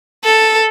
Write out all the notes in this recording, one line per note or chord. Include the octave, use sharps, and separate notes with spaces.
A4